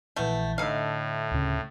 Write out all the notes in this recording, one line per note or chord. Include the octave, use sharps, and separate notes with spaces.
A#1 E3 A3 B3 G6
A2 D3 D#4 A4 E5 F5
D2 C#3